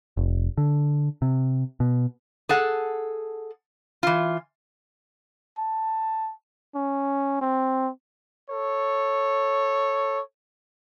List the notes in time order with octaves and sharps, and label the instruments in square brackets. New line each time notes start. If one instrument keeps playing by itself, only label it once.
[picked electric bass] F1
D3
C3
B2
[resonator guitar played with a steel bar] G#4 A4 F#5
E3 F4
[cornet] A5
C#4
C4
[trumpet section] A4 C#5